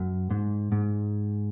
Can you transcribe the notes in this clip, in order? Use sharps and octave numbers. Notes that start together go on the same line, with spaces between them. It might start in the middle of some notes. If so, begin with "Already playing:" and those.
Already playing: F#2
G#2
G#2